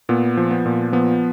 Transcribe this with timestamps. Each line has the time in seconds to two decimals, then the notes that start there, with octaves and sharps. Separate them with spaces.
0.09 A#2 B3
0.37 F3
0.51 B3
0.66 A#2
0.93 F3 B3